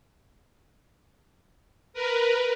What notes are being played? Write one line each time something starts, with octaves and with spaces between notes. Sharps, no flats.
A#4 B4